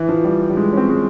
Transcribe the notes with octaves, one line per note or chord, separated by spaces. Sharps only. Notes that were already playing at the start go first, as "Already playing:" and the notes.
Already playing: E3
F3
G3
G3
G#3
C#4
C4
G#3